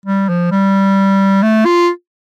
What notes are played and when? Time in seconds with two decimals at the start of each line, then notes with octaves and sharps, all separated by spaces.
0.06 G3
0.29 F3
0.51 G3
1.43 A3
1.65 F4